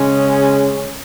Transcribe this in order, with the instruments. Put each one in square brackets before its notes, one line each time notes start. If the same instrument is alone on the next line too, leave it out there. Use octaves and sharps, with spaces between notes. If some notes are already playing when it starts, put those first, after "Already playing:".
Already playing: [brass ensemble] C#3 G#3 C#4